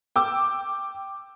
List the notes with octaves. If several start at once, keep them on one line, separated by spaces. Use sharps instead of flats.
G5 D6 E6